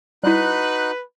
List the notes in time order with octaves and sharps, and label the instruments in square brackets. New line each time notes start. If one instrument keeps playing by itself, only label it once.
[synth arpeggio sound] G3 E4 [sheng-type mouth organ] D#4 F#4 F#6 [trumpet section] B4